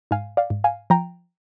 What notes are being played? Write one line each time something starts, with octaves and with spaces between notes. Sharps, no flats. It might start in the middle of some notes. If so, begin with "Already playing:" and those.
G#2 F5 G#5
D5 F5
G#2
F5 G#5
F3 G5 A#5